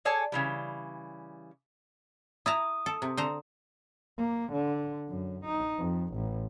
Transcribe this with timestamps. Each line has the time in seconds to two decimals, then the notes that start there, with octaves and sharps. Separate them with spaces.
0.05 G#4 A4 C#5 D5 G#5 A5
0.32 C#3 E3 G3
2.46 E4 A5 A#5 D#6
2.86 A4
3.02 C3
3.17 D3 C5 A#5
4.18 A#3
4.53 D3
5.10 F#2
5.45 D#4
5.79 F2
6.14 A1